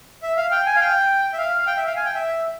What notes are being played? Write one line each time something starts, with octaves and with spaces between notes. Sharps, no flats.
E5
F5
G5
G#5
F5
G5
E5
F5
G5
E5
F5
G#5
G5
E5